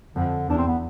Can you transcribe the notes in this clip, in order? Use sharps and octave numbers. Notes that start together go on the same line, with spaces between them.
F2 D3
E2 D4
C4
B3